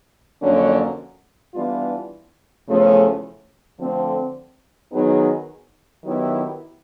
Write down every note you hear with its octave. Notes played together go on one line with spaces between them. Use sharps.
F2 D3 F#3 A#3 C#4
E3 G3 B3 D4 F4
E2 C#3 F3 A3 C#4
D3 F3 A3 C4
D#3 F#3 B3 D#4 G#4
D#3 F#3 B3 E4 G4